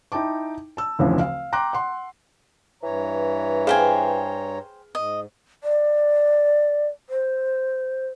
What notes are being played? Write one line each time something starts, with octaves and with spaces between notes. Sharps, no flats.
D#4 E4 G5 A5 D6
A5 E6
F1 D2 C#3 E3 F3
F5
G5 A#5 C6 D6 F#6
F#5 C6
G2 E3 C#5 A#5
G#4 B4 C5 F5 G5 G#5
G#2 D#5
D5
C5